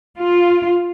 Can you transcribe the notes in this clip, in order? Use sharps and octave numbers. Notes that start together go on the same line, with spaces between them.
F4